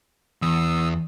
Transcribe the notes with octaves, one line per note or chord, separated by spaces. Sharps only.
E2 D#6 E6